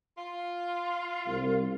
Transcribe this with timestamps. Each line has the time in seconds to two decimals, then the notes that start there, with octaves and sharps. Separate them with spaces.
0.17 F4 F5
1.27 C2